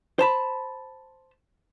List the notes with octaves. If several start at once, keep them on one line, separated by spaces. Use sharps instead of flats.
C5 A5 B5